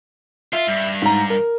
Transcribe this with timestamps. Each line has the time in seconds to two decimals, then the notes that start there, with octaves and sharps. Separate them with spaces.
0.53 F4 E5
0.67 G2
1.02 G#2 A#5
1.30 A#4